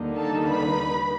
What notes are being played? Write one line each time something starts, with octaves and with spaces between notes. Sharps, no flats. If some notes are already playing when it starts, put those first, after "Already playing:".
Already playing: D#2 D3 G3 A#3 D#4
A4 A5
B4 B5